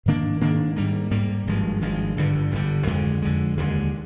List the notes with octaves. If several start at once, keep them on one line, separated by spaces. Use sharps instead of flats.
G#2 D#3 A#3 D4
G#2 D#3 A#3 D4
G#2 G3 A#3
G#2 G3 A#3
G#1 G2 F3 G#3
G#1 G2 F3 G#3
G1 G2 D3 G3
G1 G2 D3 G3
F2 D3 G#3
F2 D3 G#3
D#2 D3 F3 G#3